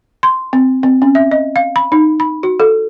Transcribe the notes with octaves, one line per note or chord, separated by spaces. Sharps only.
C6
C4
C4
C#4
E5
D#5
F5
B5
D#4
B5
F#4
A4